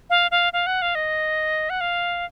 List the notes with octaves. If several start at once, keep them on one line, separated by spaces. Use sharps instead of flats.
F5
F5
F5
F#5
F5
D#5
F#5
F5